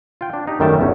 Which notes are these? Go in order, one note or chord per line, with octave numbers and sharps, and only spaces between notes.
F4 G5
D4
D#4 G4
F#2 D#3 G3 A3 G5 A5
G1 E2 C#4